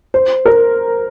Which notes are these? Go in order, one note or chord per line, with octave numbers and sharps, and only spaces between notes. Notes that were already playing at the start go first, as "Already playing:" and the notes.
C5
A#4